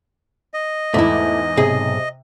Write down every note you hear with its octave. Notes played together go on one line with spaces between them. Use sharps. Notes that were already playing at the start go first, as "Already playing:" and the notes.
D#5
E2 G#2 A3 E4 D6
B1 G#2 C3 G#4